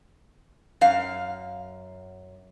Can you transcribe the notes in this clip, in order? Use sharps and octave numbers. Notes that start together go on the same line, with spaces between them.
F#2 F5